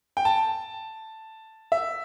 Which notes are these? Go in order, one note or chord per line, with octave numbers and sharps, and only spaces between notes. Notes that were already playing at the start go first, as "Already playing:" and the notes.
G5
A5
E5